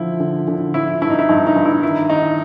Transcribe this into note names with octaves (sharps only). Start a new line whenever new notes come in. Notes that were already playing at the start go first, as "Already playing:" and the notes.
Already playing: D3 F3 E4
D3
D3
F3 E4
G2 E4
D#4
E4
G2 D#4
D#4
G2
E4
D#3 E4
D#3 D#4